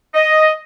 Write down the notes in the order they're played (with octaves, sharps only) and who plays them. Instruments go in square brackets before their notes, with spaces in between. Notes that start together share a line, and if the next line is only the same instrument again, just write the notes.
[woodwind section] D#5